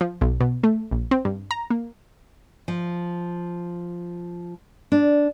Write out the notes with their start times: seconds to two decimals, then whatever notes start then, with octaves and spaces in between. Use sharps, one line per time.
0.01 F3
0.21 B1
0.40 B2
0.63 A3
0.91 A#1
1.11 C4
1.25 G2
1.51 A#5
1.70 A#3
2.68 F3
4.92 D4